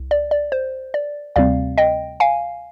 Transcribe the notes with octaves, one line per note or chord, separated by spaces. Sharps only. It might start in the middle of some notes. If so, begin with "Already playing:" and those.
Already playing: C2
D5
D5
C5
D5
D2 C3 G3 C4 D5 F5
D#5 G5
F5 G#5